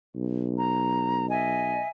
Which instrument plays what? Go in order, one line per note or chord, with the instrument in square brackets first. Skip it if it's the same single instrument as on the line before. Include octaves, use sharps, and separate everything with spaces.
[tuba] B1
[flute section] A#5
D#5 E5 G#5